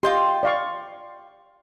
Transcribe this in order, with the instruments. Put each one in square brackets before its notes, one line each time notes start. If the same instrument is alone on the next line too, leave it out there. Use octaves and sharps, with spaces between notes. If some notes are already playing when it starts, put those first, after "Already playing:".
[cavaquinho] F4 G5 C6 [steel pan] G4 D#5
[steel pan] D5 F5 C#6